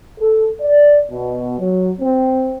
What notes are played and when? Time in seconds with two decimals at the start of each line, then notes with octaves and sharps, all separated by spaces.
0.20 A4
0.61 D5
1.12 B2
1.59 F#3
2.01 C4